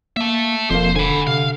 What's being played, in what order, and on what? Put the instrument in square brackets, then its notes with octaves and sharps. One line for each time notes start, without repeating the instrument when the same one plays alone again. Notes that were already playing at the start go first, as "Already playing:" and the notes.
[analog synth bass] A#3 [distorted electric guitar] E5 A5
[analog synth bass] E1 [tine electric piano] F2 A#3 [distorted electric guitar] C5
[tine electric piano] D3 [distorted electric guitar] G#5 B5
[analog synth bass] C3 [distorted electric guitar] F5